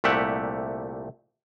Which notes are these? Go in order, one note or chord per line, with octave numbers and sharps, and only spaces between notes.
C2 A#2 A3 G4 E5 F#5